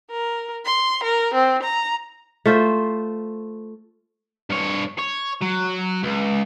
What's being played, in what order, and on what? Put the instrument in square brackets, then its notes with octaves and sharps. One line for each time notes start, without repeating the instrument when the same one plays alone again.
[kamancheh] A#4
C6
A#4
C4
A#5
[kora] A3 F4 C5 E5
[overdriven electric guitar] G2 C#5
C#5
F#3
C#2